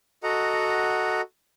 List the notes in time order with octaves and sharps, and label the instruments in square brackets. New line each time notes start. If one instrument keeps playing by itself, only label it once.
[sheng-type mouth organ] F#4 A4 D#5 F#5 A#5